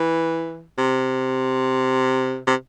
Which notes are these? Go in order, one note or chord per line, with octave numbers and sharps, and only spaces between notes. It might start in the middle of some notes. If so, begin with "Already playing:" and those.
Already playing: E3
C3
C3